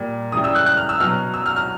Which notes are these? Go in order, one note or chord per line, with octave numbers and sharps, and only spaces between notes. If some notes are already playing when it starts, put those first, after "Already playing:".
Already playing: A#2 G3
C#3 E3 G3 D#6
E6
F#6
F#6
F6
E6
B2 F#3 F6
E6
F6
F6